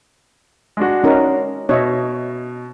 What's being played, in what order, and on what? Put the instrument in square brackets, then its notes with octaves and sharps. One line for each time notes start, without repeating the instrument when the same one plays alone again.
[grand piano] G#3 D4 F#4
[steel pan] C#4 D#4 A#4
[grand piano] B2 [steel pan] C#5 D#5 E5